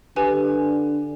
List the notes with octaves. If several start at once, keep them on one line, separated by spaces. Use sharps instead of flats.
D3 G4 B4 G#5